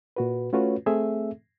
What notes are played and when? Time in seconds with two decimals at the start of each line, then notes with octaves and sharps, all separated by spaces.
0.16 A#2 F#4 B4
0.53 A3 C#4 F4 F#4 B4 C#5
0.86 A3 C4 G#4 A4 E5